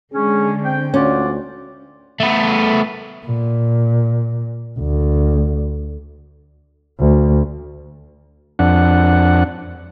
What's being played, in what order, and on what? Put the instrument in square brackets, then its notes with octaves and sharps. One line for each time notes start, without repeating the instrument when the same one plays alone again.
[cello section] D3 G#3 [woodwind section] C#4 [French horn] G#4
[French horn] C4 [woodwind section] G5
[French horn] D2 [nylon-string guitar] C#4 [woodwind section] F4 F#4 D5
[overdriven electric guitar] A3 B3
[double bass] A#2
D2
D2
[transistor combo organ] F2 D4 F#5